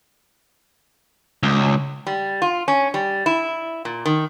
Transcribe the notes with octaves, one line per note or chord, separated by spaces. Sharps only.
C#2
G3
F4
C#4
G3
E4
A#2
D#3